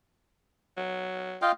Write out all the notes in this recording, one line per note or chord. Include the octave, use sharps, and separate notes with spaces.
F#3
F4 D#5 F5 G5